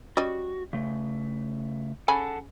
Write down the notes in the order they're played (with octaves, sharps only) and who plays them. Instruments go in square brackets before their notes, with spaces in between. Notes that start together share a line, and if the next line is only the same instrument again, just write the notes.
[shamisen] G3 C#4 D#5 [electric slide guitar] F#4
[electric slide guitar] C#3 A3
[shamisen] C#3 G#5 B5 [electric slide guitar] A4 F#5 A5